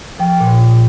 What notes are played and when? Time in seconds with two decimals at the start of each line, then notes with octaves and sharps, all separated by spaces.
0.19 F3 G5
0.40 A#2
0.60 A#2